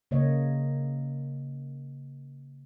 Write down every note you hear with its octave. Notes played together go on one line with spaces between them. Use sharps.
C#3 A#3 C#5 D#5